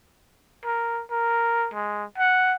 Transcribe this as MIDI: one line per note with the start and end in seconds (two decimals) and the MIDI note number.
0.65 1.02 70
1.11 1.68 70
1.74 2.04 56
2.18 2.56 78